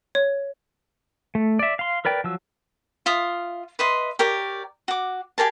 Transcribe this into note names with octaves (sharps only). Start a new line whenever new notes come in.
C#5
A3
D5 E5
F5 C6
A#4 B4 D5 G5
F3 F#3 E6
F4 E5 F5 D#6
B4 D#5 E5 C6
G4 A#4 C#5 D5
F#4 D6
G4 G#4 A#4 A5